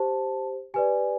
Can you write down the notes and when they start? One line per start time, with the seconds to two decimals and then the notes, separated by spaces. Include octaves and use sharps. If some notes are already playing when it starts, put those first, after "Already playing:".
Already playing: G4 C5 A5
0.74 G4 B4 D5 G#5